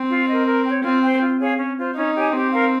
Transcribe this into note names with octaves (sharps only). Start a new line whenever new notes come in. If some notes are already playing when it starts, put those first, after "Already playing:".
Already playing: C4
F4
A#4 D#5
A#4
C#5 G5
C4 F4
C5 G5
F4
G#4 C#5 F5
C#4
F4 C5
C#4 D#4
G4 C#5 G#5
C4 G4
A#4 F5